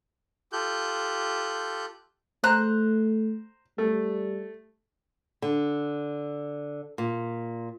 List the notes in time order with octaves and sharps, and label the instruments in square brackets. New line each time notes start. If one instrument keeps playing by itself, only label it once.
[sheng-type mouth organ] F4 G4 A4 F#6 G6
[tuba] A3 [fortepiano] C5 A#5 [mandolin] F#6
[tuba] G3 [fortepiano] A3
[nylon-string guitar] D3
A#2